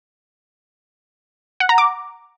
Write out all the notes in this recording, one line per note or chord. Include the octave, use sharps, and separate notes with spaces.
F#5
A#5
D6